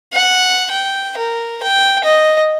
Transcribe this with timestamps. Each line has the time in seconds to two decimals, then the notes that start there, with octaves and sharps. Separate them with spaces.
0.13 F#5
0.71 G5
1.17 A#4
1.63 G5
2.04 D#5